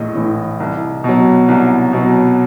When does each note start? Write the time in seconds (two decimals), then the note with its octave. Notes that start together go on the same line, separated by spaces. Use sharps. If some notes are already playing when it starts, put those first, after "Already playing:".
Already playing: A#1 A2 E3 D#5
0.15 A2 E3
0.60 C2
1.04 B2 F#3
1.48 C2
1.93 B2 F#3